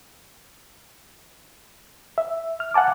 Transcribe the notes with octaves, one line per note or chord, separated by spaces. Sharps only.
E5
F6
F5 F#5 G#5 A5 D6